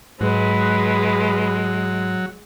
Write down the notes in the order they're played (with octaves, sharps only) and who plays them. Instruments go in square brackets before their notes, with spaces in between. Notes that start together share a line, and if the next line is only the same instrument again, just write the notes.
[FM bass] G#2 [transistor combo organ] F#3 [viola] G#3 [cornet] B4